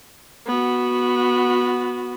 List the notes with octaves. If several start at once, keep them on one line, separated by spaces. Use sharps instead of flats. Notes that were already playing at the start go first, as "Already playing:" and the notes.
B3 F#4